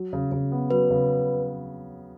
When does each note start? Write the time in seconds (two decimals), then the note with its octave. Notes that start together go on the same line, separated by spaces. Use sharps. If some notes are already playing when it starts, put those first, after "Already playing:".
Already playing: F#3
0.13 C#3
0.32 C#3
0.52 B3
0.70 F#3 B4
0.90 C#3